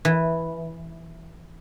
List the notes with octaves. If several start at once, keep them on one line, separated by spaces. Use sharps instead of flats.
E3